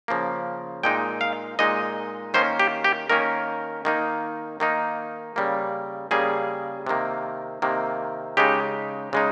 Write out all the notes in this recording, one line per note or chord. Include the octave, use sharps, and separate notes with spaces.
C#3 F3 A#3
A#2 G#3 D#4 G5
F5
A#2 G#3 D#4 D#5
D#3 A#3 C#4 C5
G4
G4
D#3 A#3 C#4 A#4
D#3 A#3 D#4
D#3 A#3 D#4
C#3 G3 A#3
C#3 G3 A#3 G#4
C3 D#3 A#3
C3 D#3 A#3
C#3 G#3 D#4 G4
C#3 G#3 D#4